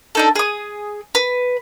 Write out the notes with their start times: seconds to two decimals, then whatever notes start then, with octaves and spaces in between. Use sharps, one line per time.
0.15 D4 D#4 A4
0.36 G#4 D#6
1.15 B4